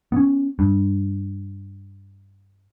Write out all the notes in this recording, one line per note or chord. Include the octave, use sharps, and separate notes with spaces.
B3 C#4
G2